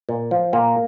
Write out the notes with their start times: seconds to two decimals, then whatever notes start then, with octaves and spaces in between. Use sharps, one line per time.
0.09 A#2
0.31 F3
0.53 A#2 A#3